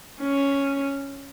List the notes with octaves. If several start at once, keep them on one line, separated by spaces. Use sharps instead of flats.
C#4